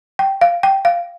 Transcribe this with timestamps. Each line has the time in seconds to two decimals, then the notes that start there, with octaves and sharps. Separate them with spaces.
0.19 G5
0.41 F5
0.63 G5
0.85 F5